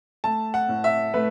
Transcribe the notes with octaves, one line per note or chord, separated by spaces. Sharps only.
A3 A5
F#5
A2
E5
A3 B4